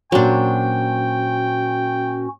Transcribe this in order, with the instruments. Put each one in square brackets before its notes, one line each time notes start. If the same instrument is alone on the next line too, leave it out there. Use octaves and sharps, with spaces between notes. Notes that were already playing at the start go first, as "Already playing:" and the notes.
[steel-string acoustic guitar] A#2 C5 [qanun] F#3 D4 [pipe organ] C#4 F#4 [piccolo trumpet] G5